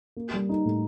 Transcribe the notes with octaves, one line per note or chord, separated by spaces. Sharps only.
A#3
G3
D#4
A2